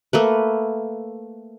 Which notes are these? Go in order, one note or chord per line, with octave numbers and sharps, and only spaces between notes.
A3 A#3 B4